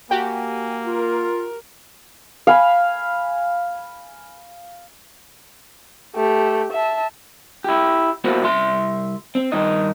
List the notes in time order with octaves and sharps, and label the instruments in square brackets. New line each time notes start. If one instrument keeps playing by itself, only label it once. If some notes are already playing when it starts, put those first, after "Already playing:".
[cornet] A#3 [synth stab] F#4 G4 [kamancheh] G#5
[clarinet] F4 [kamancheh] A#4
[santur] F5 G#5 B5
[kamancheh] A3 G4
E5 A5
[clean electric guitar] E4 G4
A#3 B3 E4 F#4 C5
C2 E5 C6
C4
G2 D#3 D#4 D#5